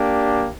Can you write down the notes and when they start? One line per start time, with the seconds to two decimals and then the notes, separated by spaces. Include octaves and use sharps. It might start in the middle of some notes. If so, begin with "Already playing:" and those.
Already playing: A#3 D4 G4